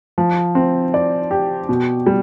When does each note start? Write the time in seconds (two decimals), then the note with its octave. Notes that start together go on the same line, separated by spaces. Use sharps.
0.18 F3
0.55 C4
0.94 D5
1.31 G4
1.69 B2
2.06 G3